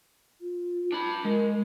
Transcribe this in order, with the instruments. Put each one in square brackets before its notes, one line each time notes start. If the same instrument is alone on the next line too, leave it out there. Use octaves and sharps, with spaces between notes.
[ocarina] F4
[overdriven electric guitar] D4 B5
[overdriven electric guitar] G#3 [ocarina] A#4